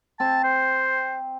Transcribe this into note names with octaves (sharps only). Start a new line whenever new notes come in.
C4 A5
C5